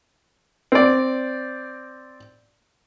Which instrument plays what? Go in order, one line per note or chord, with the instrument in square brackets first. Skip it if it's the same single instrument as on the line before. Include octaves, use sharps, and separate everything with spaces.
[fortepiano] C4 D5